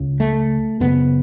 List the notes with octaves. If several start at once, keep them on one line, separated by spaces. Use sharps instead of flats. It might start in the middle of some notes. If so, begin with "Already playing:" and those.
Already playing: C#2 C#3
A3
F#2 C#3 B3